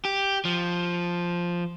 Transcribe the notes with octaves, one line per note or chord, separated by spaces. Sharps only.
G4
F3